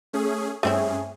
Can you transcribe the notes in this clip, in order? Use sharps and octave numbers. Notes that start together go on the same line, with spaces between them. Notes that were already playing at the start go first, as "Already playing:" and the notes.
A3 C#4 G#4
G2 A3 C4 C#4 E4 G#4